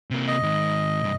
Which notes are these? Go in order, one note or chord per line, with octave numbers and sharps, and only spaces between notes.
C3 A#3
D#5
G#2 D#3
C2 G2